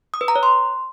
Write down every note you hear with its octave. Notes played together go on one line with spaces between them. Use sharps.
D#6
B4
A#5
C#5
C6